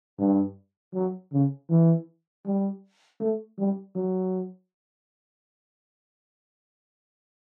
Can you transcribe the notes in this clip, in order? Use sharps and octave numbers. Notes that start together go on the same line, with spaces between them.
G2
F#3
C#3
E3
G3
A3
G3
F#3